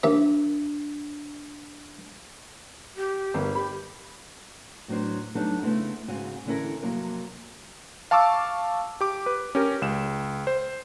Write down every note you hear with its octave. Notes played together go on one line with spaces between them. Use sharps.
D#2 D4 E5
G4
G1 A#4
G4 B5
A2 F#3 B3 D4 C5
F#3 G3 A3 B3 D4 D#4
C#3 A3 B3 C4 E4
G#2 C#3 C4 F#4 G#5
D3 E3 C#4 E4 A4 A#4
F2 C3 F#3 A#3 A#4
F5 A5 C#6 D6 E6
G4 D6
B4
C#4 G4 A#4
C#2 E7
C5